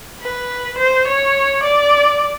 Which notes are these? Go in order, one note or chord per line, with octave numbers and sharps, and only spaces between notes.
B4
C5
C#5
D5